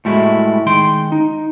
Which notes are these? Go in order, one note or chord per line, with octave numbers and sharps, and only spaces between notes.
A2 G3 G#3 E4 F#4 E5
D#3 G#3 G5 C6
D#4